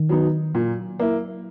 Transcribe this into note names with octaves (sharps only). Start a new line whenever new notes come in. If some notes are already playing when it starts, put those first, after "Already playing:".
Already playing: D#3
F#3 B3 D#4
A#2 F#3
A#3 E4